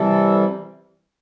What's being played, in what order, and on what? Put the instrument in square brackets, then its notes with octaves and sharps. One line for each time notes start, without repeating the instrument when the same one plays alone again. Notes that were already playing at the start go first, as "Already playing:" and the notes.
Already playing: [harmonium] C3 E3 G3 A4